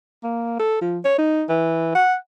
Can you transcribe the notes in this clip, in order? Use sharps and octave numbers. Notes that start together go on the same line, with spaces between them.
A#3
A4
F3
C#5
D#4
E3
F#5